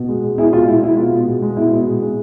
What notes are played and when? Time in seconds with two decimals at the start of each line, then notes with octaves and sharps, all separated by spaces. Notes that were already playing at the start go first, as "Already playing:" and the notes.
Already playing: B2
0.09 G#3
0.24 G#3
0.38 B2 E4 G#4
0.53 B2 F4
0.68 G#3 E4
0.83 G#3 E4
0.97 B2 F4
1.12 B2
1.27 G#3
1.42 G#3
1.57 B2 E4
1.72 B2
1.86 G#3
2.02 G#3